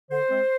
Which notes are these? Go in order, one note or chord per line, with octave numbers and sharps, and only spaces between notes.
D3 C5
G#3 C4